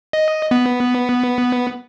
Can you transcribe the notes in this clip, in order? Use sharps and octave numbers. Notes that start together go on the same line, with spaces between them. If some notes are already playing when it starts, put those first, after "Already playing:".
D#5
B3